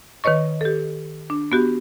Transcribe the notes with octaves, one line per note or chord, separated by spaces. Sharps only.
D#3 B4 C#5 D#5 C#6
G4 A4
D4
B3 F#4 G4